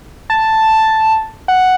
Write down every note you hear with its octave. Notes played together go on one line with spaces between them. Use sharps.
A5
F#5